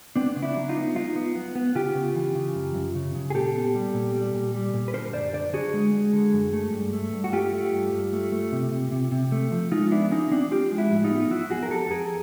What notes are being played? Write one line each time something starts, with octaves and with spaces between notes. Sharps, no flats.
B3 C4 D4
C#3
D4 E4
F#3
D#4 F4
B3
F#3 D#4 F4
B3
B3
B3
C#3 F4 G4
C#3
E3
C#3
F#2
F#2
C#3
C#3
G#4
A#2 G4 A4
B3
G3
A#2
G3
A#2
G3
A#2
B4
D3 A#4 C5
F#2 C5 D5
D3 C5 D5
D3 F#4 G#4
G#3
G#3
D3
F#2
A3
G2
A3
G2
F#4
A3 F4 G4
A3
G2
G2
A3
A3
C3
C3
C3
C3
A3
F3
G#3 D#4 F4
B3 D4 E4
F3 C#4 D#4
F3 C4 D4
F3 F4 G4
G#3
E4 F#4
A2
D#4 F4
B3
F4
F#3 E4 F#4
F2 F#4 G#4
A#4
F2 G4 A4
A4
F2 G#4 A#4